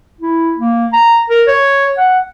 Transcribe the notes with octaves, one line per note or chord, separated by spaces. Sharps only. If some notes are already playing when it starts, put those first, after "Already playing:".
E4
A#3
A#5
A#4
C#5
F#5